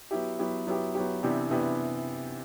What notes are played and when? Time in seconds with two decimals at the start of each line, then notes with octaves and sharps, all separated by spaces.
0.11 F#3 B3 E4 G4
0.39 F#3 B3 E4 G4
0.67 F#3 B3 E4 G4
0.95 F#3 B3 E4 G4
1.23 C3 E3 B3 D4 G4
1.50 C3 E3 B3 D4 G4